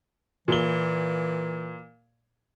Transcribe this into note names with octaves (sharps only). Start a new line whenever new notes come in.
A#2 E3 G7